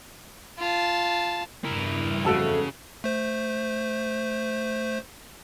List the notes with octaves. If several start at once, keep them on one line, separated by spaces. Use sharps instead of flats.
F4 A5
E2 G2 E3 E4 A#4
F2 C#3 A3 F#4 A4 A5
A3 C5